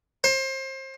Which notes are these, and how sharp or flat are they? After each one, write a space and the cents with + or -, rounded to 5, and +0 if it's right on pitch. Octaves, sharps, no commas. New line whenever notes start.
C5 +30